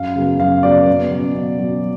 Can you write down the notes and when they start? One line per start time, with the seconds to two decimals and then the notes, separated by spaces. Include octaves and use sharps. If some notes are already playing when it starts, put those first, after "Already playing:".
Already playing: F#2 F5
0.16 C#3 F#3 B3
0.40 F#2 F5
0.63 C#3 F#3 B3 D5
0.88 B2
1.11 F#3 C#4
1.35 B2
1.59 F#3 C#4